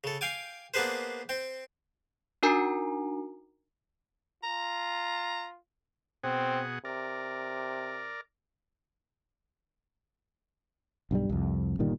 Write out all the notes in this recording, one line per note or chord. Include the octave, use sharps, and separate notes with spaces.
C#3 A4
F5 G5 G#5 D6
A#3 B3 D4 G#4 B4 C5
C4 G5
D4 D#4 F#4 A#4 G#5 A#5
F4 A#5
B2 C4 G#4 F#5
C3 A#4 D5
B1 G2 F3 G3
C2 F2
G1 A#2 D#3 G3